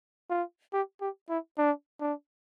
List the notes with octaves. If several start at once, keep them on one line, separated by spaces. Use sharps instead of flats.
F4
G4
G4
E4
D4
D4